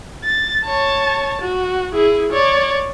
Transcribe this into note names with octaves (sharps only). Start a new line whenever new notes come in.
A6
C#5 A5
F#4
E4 G#4
C#5 D5